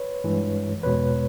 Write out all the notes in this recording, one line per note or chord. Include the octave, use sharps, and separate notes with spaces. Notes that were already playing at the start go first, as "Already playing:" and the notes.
Already playing: B4 C#5
G2 E3 G#3
E2 B2 G#3 B4 C#5